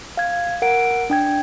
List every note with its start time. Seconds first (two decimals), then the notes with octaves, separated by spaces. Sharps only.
0.17 F5 G#6
0.62 A#4 F#5 D7
1.10 D4 G5 G#6